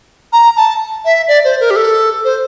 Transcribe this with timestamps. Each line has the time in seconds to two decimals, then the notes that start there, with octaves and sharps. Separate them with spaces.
0.33 A#5
0.57 A5
1.05 E5
1.28 D5
1.44 C5
1.60 A#4
1.70 G4
1.76 A4
2.24 C5